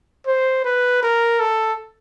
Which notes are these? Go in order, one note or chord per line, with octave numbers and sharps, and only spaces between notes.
C5
B4
A#4
A4